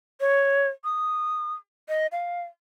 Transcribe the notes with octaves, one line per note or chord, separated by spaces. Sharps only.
C#5
D#6
D#5
F5